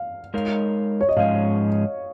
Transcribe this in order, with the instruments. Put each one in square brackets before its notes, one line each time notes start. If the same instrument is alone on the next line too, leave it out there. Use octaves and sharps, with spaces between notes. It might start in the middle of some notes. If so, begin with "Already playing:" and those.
Already playing: [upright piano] F5
[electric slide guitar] G#3 D#4 A#4 C#5 F5
[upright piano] C#5
D#5
[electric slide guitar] G#2 F3 G#3 C#4 [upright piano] F5